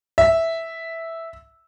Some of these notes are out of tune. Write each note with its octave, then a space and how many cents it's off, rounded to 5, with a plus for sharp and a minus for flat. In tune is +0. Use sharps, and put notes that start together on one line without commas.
E5 -5